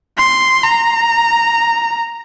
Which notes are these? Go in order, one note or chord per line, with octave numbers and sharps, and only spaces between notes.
C6
A#5